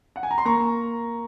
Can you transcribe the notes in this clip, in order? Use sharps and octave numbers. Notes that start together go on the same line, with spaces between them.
F#5
G#5
A#5
C6
A#3 A#5 C#6